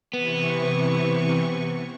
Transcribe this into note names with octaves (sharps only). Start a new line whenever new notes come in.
C3 E3 B3 C#6